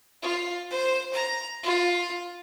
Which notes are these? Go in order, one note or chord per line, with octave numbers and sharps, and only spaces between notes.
F4
C5
A#5
F4